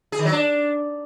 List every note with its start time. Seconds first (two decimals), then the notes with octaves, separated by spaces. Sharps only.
0.12 G#4
0.19 D#3
0.25 F#3
0.32 D4